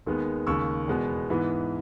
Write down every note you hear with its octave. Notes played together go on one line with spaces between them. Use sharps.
D#2 D#3 G#3 B3
D#2 C#3 G#3 C#6 E6
E2 B2 G#3 B3
G#2 E3 B3